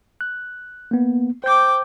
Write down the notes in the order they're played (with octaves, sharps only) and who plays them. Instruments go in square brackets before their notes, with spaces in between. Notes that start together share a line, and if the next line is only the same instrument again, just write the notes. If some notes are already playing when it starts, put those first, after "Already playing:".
[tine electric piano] F#6
A#3 B3
[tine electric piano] C5 G6 [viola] G5 D6